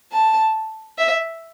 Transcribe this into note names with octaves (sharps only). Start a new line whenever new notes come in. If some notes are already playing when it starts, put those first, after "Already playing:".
A5
E5